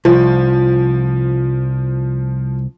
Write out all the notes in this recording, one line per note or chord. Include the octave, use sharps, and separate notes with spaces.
C2 F3